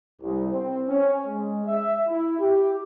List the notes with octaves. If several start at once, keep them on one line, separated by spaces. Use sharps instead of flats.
C2
C4
C#4
G#3
E5
E4
G4